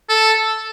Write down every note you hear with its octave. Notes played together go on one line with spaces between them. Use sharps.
A4